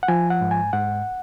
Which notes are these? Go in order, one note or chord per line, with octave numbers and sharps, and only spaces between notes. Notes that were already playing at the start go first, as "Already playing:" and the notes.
F#5
F3 G#5
F#5
G#2
G#5
G#2 F#5